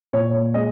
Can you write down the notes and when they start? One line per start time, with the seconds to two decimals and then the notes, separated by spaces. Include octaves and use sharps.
0.13 A#2 C#5
0.54 G#3 D#5